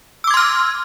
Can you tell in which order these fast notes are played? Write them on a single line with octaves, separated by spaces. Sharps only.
E6 D6 G#6 C6 F6